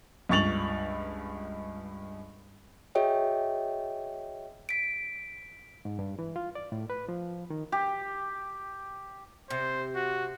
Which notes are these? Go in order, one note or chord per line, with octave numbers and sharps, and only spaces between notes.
C#2 G2 C#6 A6 F7 F#7
F#4 G#4 C#5 D#5 E5 G5
B6 D7
G#2
G2
E3
F4
D5
A2
B4
F3
D#3
G4
C3 C5
F#4